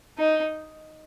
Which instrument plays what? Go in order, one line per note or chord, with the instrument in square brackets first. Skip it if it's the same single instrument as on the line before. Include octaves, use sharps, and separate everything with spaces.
[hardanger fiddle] D#4